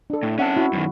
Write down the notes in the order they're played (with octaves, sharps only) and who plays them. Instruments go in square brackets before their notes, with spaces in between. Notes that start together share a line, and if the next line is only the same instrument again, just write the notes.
[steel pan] D4 A4
[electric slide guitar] A2
[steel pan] C4 E5 F#5 [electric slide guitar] C#4 A5
[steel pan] E4 F#4
[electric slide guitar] F#2 C3 D#3